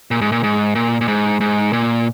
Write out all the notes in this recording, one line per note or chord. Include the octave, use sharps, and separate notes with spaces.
A#2
G#2
A#2
G#2
A#2
A#2
G#2
G#2
A#2